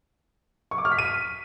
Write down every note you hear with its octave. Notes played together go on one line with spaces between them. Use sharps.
C#6
D6
F6
B6
D#7